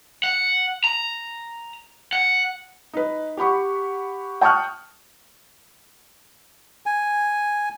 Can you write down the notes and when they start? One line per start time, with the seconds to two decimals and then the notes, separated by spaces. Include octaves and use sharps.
0.24 F#5
0.84 A#5
2.13 F#5
2.93 D#4 B4
3.37 G4 F#5 B5 C#6
4.41 G5 A5 C#6 D#6 F6 F#6
6.86 G#5